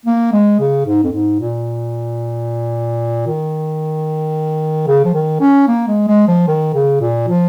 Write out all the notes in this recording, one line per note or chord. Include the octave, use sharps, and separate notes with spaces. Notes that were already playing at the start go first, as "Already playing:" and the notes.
A#3
G#3
C#3
G#2
F2
G#2
A#2
D#3
C#3
F3
D#3
C#4
A#3
G#3
G#3
F3
D#3
C#3
A#2
F3